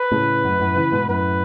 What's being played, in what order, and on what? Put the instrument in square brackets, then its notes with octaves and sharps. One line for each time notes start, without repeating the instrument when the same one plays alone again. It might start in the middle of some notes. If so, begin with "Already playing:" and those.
Already playing: [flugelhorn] B4
[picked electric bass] A2 C#3
F#2
F#2 A2
C#3 E3
G#2 B2
[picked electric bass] F#2 A2 [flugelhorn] B4